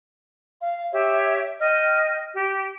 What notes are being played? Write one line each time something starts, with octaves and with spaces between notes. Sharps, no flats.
F5
G4 C#5 E5
D#5 G5 F6
G4